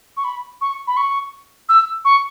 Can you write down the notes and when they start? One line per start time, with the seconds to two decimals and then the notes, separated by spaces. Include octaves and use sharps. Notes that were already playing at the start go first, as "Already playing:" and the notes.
0.17 C#6
0.24 B5
0.61 C#6
0.87 B5
0.97 C#6
1.69 E6
2.05 C#6